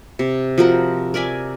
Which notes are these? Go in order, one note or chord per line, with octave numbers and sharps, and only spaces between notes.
C3
F3 F#4 A#4 F#5
A#4 D5 E5 G#5